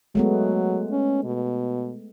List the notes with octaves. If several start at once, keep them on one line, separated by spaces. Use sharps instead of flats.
F#3 G#3 A3 B3
C#4
B2